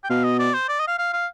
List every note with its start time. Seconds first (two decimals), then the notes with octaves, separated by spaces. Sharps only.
0.04 G5
0.10 B2 F5
0.24 D#5
0.39 D5
0.54 C5
0.69 D5
0.79 D#5
0.88 F5
0.98 F5
1.13 F5